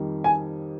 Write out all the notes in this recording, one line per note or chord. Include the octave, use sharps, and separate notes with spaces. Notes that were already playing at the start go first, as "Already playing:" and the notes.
Already playing: F2 D#3 G3
G#5